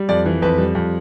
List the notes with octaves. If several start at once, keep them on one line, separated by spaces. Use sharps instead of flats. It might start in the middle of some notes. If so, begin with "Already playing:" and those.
Already playing: G3
F2 D5
E3
F2 B4
G3
F2